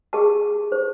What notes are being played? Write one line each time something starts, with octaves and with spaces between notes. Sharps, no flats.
G4 G#4 D#5 A5
C5